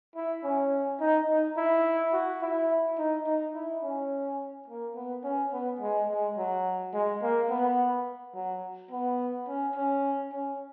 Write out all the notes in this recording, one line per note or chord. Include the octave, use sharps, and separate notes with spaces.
E4
C#4
D#4
D#4
E4
F#4
E4
D#4
D#4
E4
C#4
A#3
B3
C#4
B3
G#3
G#3
F#3
G#3
A#3
B3
F#3
B3
C#4
C#4
C#4